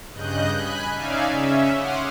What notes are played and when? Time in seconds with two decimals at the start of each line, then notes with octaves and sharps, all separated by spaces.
0.13 G2 C#3 D#5 F#6 G6
0.55 G#5 B5 F#6
0.94 C#4 D#4 D5 E5 F5 G#5
1.31 C#3 C#4 E5
1.74 F#5 C6 D6 D#6 F6